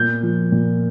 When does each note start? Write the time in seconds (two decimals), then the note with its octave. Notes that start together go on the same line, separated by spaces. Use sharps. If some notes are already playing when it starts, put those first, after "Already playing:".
Already playing: A#2 G6
0.23 F3
0.52 A#2